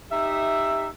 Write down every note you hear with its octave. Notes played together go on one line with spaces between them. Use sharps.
D#4 G4 E5